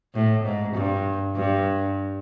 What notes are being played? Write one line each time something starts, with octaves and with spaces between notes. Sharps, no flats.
A2
G#2
G2
G2